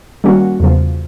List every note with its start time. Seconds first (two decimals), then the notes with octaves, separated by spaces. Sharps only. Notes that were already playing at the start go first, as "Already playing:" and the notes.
0.24 D#3 G3 A#3 C#4 F#4
0.60 E2 C#3 F3